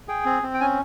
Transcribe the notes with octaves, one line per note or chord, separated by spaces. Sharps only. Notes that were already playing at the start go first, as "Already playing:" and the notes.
G#4 G5
C4
C4
G5
C#4 G#5